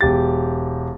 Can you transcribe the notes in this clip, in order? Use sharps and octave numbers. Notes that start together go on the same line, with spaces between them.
E1 G4 A6